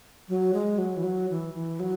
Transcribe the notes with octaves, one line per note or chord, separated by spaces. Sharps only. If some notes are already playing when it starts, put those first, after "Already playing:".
F#3
G#3
F#3
E3
F#3
E3
E3
F#3